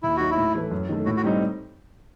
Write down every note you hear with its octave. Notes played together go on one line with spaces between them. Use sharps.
D#2 E4
D#3 F#3 F#4
E4
A2
E3 A3 E4 B4
F#2
D#3 A3
A2 F#4
F#4
G3 C4 D#4